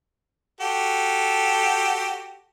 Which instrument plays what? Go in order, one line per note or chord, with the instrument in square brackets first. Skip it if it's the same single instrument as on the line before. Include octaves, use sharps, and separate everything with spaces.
[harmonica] F#4 G4 A4